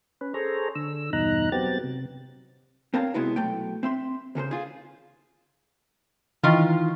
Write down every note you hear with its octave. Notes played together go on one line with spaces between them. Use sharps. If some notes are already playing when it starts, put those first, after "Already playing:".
C#4 B4
G#4 A4 C5 C#5 A#5
D3 E6
E2 G2 B2 D#4 A#5 F#6
F#3 B3 C4 G4 A6
C3
C4 A#4 C#5 F5 A5 A#5
C3 G#3 B3 E4 F#4
B1 A3 G5
C4 E5 C6
C#2 C#3 A4 C5
F4 G#4
D#3 E3 F4